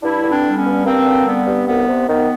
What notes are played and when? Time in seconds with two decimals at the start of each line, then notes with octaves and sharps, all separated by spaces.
0.03 G2 D4 E4
0.24 D3
0.30 C4 D4
0.44 G3
0.57 B3 C#4
0.65 G2
0.85 G2 A#3 C4
1.06 D3
1.26 G3 B3
1.47 G2
1.67 C2 B3
1.88 C3
2.08 D#3 B3